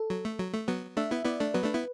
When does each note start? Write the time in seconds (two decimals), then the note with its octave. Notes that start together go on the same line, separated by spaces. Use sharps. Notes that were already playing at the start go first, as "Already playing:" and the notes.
Already playing: A4
0.10 F#3
0.25 A3
0.39 F#3
0.54 A3
0.68 F#3 B3
0.97 A3 D4 E5
1.11 B3 E4
1.25 B3 E4 D5
1.40 A3 D4
1.54 F#3 B3 B4
1.64 A3 D4
1.74 B3 E4